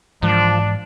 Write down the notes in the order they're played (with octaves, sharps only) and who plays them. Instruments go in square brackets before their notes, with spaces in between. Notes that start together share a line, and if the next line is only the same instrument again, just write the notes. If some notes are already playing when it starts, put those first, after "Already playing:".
[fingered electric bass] G#2 E3 G#3 [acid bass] F3 [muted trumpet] D4